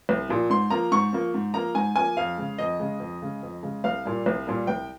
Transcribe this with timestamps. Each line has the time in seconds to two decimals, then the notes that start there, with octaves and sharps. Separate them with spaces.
0.09 C2
0.29 A#2 F3
0.50 G#2 C6
0.70 F3 A#3 A#5
0.91 G#2 C#6
1.13 F3 A#3
1.34 G#2
1.54 F3 A#3 A#5
1.75 G#2 G#5
1.96 F3 A#3 G#5
2.17 F2 F5
2.37 C#3 G#3
2.58 F2 D#5
2.79 C#3 G#3
3.00 F2
3.22 C#3 G#3
3.43 F2
3.63 C#3 G#3
3.84 C2 F5
4.05 A#2 G3 A#3
4.26 C2
4.47 A#2 G3 A#3
4.67 C2 G5